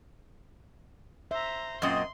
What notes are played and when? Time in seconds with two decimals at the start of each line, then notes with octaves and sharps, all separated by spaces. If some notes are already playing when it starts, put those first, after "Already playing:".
1.31 C5 E5 A#5
1.82 F#2 A#2 C4 D#5 C6